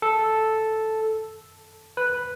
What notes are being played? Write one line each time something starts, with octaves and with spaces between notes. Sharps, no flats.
A4
B4